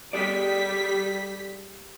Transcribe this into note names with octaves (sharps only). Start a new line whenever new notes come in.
G3 G#4 A4 D5 B6